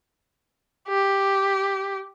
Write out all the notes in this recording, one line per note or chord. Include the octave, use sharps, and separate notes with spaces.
G4